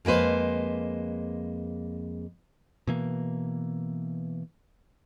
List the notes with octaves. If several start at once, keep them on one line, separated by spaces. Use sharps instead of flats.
F2 G#3 A#3 B4 C5
B2 E3 A#3